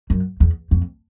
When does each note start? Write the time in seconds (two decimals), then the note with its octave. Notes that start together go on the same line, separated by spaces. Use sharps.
0.10 F#2
0.40 E2
0.71 F2